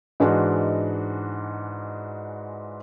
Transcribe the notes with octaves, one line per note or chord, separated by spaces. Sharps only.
G#2 E3 G#3 D4 D#4 F#4